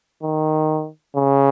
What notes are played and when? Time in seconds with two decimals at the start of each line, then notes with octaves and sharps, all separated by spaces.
0.23 D#3
1.16 C#3